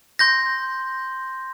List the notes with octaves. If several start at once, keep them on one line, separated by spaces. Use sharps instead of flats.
C6 G6 A#6